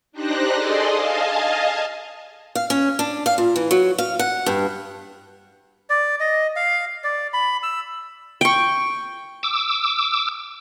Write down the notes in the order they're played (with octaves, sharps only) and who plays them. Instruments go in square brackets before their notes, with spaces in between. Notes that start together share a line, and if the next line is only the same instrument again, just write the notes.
[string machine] D4 D#4 G4 C5 F#6 A#6
G#4 A4 D5 D#5 C6
D#5 F5 G#5 A5
[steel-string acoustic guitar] F5
C#4
D4
F5
A#2
E3
F#3
F5
F#5
G2
[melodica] D5
D#5
F5
D5
B5
E6
[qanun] G5 C#6
[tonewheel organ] D6 E6